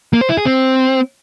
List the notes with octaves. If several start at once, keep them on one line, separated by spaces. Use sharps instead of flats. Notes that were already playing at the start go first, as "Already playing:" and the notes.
A#3
C5
E4
G#4
C4